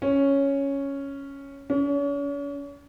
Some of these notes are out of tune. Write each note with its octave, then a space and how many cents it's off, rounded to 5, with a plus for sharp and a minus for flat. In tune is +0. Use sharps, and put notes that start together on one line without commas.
C#4 +0
C#4 +40